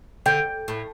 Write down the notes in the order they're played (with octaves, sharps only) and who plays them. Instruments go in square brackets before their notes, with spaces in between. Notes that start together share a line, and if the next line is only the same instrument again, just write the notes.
[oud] D3 [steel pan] G5
[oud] A2